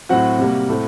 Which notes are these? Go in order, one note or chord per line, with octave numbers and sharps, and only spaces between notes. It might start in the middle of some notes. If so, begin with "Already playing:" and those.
A2 F#3 C4 F#4 F#5
C3 G3 A#3
A2 A3 C4